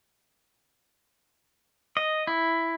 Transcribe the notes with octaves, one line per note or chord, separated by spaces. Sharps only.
D#5
E4